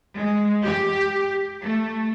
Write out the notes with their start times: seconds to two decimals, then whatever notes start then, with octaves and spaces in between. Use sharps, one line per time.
0.17 G#3
0.64 G4
1.64 A3